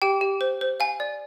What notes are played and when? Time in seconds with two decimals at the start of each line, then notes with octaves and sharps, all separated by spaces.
0.02 G4 G5
0.21 G4
0.41 C5
0.61 C5
0.80 F5 G#5
1.00 D5